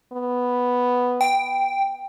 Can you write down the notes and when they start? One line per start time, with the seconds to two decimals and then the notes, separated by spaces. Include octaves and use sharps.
0.13 B3
1.21 G5